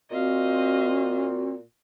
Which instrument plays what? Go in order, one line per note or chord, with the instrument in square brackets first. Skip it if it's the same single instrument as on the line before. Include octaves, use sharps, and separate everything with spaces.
[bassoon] A#2 [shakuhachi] C4 [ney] F#4 [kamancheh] D#5 F5